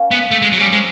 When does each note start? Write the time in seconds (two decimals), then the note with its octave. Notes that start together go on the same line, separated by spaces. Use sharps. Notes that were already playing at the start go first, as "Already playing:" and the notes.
Already playing: A#3 C#4
0.11 B3
0.31 A3
0.42 G#3
0.52 F#3
0.58 G3 G#3 C#4
0.72 G#3 C4